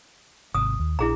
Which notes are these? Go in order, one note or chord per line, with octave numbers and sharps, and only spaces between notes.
G#1 C3 D#6
D#2
A#1 D4 E4 G#4 A#5